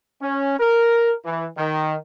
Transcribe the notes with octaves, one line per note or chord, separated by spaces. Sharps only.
C#4
A#4
E3
D#3